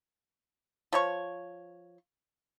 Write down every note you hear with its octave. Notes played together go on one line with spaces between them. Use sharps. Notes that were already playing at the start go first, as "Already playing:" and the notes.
F3 C#5 C#6